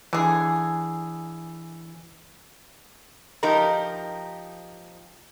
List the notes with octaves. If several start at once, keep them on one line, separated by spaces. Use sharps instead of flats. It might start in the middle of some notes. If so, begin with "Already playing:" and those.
D3 E3 G#4
F3 D#4 G4 A#4 A#5